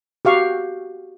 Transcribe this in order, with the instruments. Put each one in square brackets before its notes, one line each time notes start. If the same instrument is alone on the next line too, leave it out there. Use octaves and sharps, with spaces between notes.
[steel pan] F#4 G4 F5 C#6